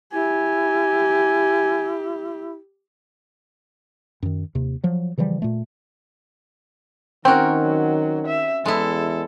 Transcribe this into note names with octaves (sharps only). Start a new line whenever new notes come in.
E4 G4 G#5
F#2 D#3
D#2 C3
F3 F#3
C#3 E3 F3 G3
A#2 A3
D#3 C4 C#4 F#4 A#4 G5
F#3
E5
E2 G#3 E4 A4